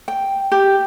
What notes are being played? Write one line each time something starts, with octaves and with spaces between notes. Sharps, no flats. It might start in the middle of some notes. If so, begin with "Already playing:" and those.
G5
G4